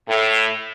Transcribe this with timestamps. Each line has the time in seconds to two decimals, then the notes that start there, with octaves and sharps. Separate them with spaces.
0.08 A2